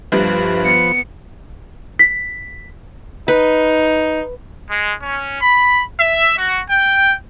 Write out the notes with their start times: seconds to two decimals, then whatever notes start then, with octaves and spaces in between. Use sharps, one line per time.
0.12 G1 G2 F3 B4
0.62 B3 C#7
1.99 B6
3.28 D#4 B4
4.70 G#3
5.02 C#4
5.41 B5
6.00 E5
6.38 F#4
6.69 G5